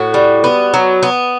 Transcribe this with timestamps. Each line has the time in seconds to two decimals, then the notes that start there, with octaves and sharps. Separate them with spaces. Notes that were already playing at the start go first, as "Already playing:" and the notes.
Already playing: A2 F#4
0.14 G3
0.44 B3
0.74 F#3
1.03 B3